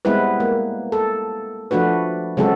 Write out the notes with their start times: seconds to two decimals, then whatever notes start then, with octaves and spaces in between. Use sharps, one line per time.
0.05 G3 G#3 B3 C4 E4 B4
0.40 A#3
0.92 A4
1.71 F3 A3 D4 F#4 B4
2.37 C#3 F#3 G#3 C4 F#4 A4